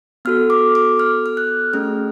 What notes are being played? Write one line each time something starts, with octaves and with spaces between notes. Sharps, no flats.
B3 F#4 A4 F6
D6
D6
F6
F6
F#6
A3 C#4 G#4 F6